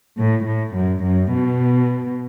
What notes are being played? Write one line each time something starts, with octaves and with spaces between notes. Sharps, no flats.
A2
A2
F#2
F#2
B2